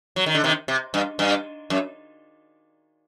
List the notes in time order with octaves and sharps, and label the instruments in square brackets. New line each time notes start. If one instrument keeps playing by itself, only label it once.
[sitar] F#3
D#3
D3
C3 D#3
C3
G2
G2
F#2